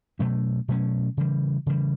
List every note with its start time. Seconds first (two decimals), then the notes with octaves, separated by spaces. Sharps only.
0.19 B2 F#3 A3 C#4
0.68 B2 F#3 A3 C#4
1.17 C#3 E3 G3
1.66 C#3 E3 G3